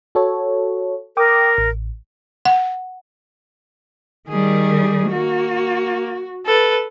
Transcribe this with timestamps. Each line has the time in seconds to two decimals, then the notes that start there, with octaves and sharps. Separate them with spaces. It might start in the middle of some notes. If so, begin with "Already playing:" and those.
0.15 F#4 A4 C#5
1.17 A#4 G5 D6 D#6
1.58 A1
2.46 F#5
4.29 D#3 G3 G#4
5.11 A#3 F#4
6.46 A4 B4